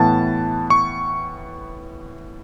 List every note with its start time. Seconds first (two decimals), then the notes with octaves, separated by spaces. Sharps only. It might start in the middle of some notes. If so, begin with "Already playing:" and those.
Already playing: A2 E3 B3 A5
0.70 C#6